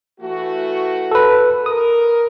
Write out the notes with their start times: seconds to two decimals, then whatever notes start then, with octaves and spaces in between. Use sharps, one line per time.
0.20 E3 A3 F#4
1.11 A4 B4
1.66 A#4 D#6